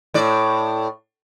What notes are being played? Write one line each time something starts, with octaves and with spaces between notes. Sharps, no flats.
A2 D5